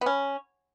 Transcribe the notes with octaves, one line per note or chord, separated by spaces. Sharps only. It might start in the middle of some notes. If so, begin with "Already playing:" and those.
B3
C#4